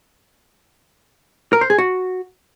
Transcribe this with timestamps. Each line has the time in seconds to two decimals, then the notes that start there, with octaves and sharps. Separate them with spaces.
1.53 A#4
1.61 C5
1.70 G#4
1.78 F#4